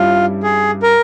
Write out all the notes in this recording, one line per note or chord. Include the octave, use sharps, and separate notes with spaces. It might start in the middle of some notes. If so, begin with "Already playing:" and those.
Already playing: G2 G3 C#4 E4 F4
G#4
A#4